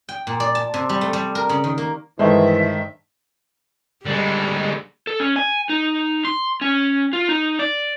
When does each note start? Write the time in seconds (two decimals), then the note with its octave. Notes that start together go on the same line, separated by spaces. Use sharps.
0.09 G5
0.27 A#2
0.40 D5
0.55 A5
0.74 C3
0.89 G3
1.01 A3
1.13 G3
1.35 A#4
1.49 C#3
1.64 D#3
1.78 A#3
2.19 G2 D#3 E3 G#3 A3 G#4 C5 E5
4.05 D3 G3 G#3
5.07 A4
5.20 C#4
5.36 G#5
5.69 D#4
6.25 C6
6.61 C#4
7.13 F4
7.29 D#4
7.59 D5